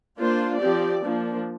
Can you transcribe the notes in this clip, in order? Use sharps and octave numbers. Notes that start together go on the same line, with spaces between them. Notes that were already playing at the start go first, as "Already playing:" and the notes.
A#3 D4 F4 C5
F3 C4 G4 D5
F3 A#3 D4